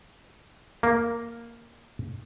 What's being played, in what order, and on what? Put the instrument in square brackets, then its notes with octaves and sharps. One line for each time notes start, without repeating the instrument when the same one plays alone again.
[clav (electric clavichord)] A#3